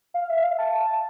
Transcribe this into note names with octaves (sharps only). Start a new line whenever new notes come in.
F5
E5
F5
A5
A5